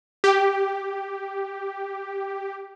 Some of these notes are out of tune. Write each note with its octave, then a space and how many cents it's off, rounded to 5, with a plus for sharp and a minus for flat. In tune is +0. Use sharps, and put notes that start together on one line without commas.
G4 +0